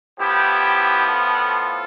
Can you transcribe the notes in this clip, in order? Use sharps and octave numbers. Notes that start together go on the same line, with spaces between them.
A2 F3 B3 E4 G4
F4 A4